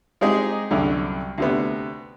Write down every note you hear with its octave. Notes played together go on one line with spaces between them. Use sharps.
G#3 C4 D#4 G4 G#4 D#5
C2 F#2 D3
D2 C3 B3